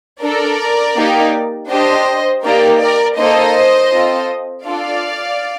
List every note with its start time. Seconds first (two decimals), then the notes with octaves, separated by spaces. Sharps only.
0.22 D4 A4 A#4 D5
0.96 A#3 D#4 G4
1.70 D4 G4 C5 D#5
2.43 A#3 D#4 G4 A#4 D5
2.80 A#4 D5
3.18 A#3 D#4 A4 C5 D#5
3.92 C4 F4 A4
4.65 D4 F4 A4 D5 F5